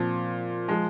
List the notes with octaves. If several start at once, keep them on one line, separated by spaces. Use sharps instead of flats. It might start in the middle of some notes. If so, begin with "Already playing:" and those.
Already playing: A#2 F3 C4
F3 G#3